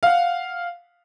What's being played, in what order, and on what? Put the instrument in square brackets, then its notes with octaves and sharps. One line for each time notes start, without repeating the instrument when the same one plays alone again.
[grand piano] F5 F#5